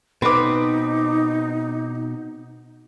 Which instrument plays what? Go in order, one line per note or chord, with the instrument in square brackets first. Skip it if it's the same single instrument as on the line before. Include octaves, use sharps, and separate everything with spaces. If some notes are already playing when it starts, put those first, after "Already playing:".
[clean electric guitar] B2 [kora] C4 B4 [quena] D#4 [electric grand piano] B5 D6